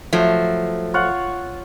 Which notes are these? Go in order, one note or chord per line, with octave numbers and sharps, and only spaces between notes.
F3 F#3 A3
F4 C#5 F#5